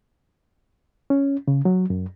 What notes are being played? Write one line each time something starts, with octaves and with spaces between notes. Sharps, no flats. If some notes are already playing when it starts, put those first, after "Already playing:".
C#4
C#3
F#3
F#2